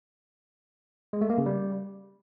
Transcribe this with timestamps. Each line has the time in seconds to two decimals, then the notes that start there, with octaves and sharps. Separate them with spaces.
1.13 G#3
1.21 A3
1.30 A#3
1.38 C#3
1.46 G3